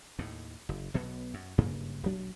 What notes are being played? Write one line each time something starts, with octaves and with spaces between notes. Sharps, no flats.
D#2 A2
F#1
B1 B2 F#3 B3
F#2
F#1 G2 C#3 A#3
D#1 B1 F#3 D4